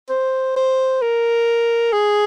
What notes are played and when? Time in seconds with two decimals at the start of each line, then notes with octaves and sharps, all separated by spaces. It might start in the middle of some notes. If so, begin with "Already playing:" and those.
0.10 C5
0.56 C5
1.01 A#4
1.93 G#4